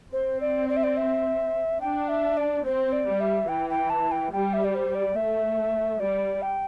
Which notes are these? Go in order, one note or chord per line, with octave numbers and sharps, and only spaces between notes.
C4 C5
D5
D5
E5
D5
E5
D4 G5
E5
D5
C4 C5
D5
G3
E5
E3 G5
G5
A5
G5
G3 G5
E5
D5
C5
D5
A3 E5
G3 D5
G5